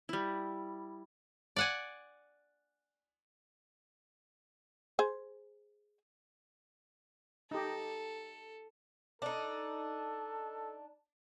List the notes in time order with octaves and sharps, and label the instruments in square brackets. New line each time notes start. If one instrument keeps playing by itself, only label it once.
[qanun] G3 E4
[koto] D5 F#5 G#5
[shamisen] G#4 C5
[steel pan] D#4 G4 [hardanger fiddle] A4
[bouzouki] D4 D#4 [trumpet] A4